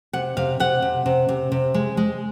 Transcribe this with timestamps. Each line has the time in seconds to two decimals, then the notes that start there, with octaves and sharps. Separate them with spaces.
0.13 C3 F#5
0.37 C3 F5
0.60 C3 F#5
0.82 C3
1.06 C3
1.29 C3
1.52 C3
1.74 G#3
1.97 G#3